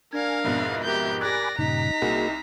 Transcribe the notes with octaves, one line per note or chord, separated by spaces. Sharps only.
D4 A#4 F5 G#5
F2 G#2 B2 E5
G4 A#4 G6
G4 D5 G#5 B5 D6 F#6 A#6
G2 A#2 C#3 D#4 A#5 B6
C2 A#3 F#4 G#4